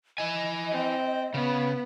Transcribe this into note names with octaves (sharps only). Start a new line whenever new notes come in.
E4 D#5 G#5
C4
C#3 B3